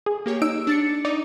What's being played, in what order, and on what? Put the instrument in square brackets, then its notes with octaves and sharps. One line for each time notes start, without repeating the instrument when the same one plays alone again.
[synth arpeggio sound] G#4
[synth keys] A#3 G4 C#5
[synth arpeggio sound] D#4 D7 [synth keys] E6
[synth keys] D4 A6 C#7
[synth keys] D#4 [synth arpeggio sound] D5